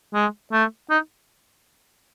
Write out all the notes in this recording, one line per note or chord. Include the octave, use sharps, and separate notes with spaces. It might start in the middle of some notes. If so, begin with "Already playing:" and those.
G#3
A3
D#4